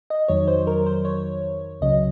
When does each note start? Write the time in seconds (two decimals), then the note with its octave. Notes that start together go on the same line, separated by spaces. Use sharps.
0.10 D#5
0.28 F2 D#3 F#3 C#5
0.48 C5
0.67 A#4
0.86 C5
1.05 C#5
1.81 C#2 C#3 F#3 D#5